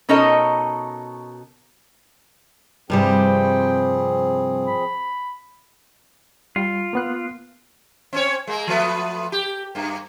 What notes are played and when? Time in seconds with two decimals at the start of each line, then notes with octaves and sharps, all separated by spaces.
0.09 B2 C#4 D#4 A4 A#4 D#5
2.90 G2 C3 F3 G3 C4 G#4 G5
4.67 B5
6.56 G3 F4
6.93 A#3 B3 F#6
8.13 C4 C#4 C#5
8.47 G#3 A#3
8.67 F3 A3 B3
9.32 G4
9.75 G2 A#3